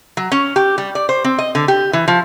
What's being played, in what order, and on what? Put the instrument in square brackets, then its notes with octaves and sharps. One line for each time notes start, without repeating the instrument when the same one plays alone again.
[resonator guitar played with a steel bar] F#3
C#4
G4
G3
D5
C5
C4
D#5
D3
G4
E3
F3